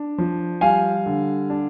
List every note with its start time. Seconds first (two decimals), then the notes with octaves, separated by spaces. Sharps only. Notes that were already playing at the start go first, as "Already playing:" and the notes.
Already playing: D4
0.18 F3
0.61 G3 F5 G#5
1.06 D3
1.50 D4